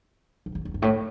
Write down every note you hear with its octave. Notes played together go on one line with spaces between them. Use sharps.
F2
E2
E2
G2
A2